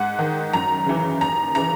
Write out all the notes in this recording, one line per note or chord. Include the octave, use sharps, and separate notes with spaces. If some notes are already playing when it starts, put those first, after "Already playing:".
Already playing: G#2 F#5
D#3
F#2 A#5
C#3 E3
D#2 A#5
C#3 E3 A#5